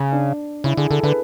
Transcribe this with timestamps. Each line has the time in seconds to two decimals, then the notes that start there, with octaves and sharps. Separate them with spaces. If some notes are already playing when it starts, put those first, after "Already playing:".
Already playing: C#3
0.12 D4
0.64 C#3 E4
0.77 D3 G#4
0.90 D3 A4
1.03 D3 B4